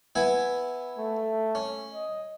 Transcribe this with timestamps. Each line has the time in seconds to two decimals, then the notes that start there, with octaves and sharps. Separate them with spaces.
0.15 B3 E4 G#5
0.98 A3
1.55 C#4
1.94 D#5